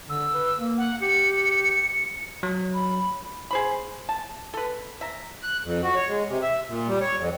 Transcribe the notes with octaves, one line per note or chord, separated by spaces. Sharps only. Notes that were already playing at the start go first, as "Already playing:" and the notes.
D3 E6
B4
A#3
F#5
G4 C#7
F#3
B5
G#4 C5 B5
A5
A4 B4
E5 A#5
F#6
F2
F#4
C#5
G#3
C3
E5
A#2
G3
C#5
F2